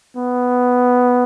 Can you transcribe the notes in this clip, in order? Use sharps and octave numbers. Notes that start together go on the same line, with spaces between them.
B3